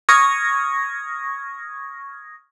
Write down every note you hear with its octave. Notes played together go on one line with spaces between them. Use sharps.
C#6 D#6 F6 G#6 A#6